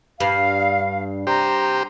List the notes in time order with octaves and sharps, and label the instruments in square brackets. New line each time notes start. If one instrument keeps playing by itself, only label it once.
[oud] G2 [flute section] F5
[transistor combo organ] G4 C5 [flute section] A#5